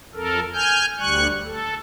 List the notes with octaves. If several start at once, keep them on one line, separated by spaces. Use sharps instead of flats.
F2 A4 A#4
G#5 F6 G6
D2 G3 C#6 F#6
A4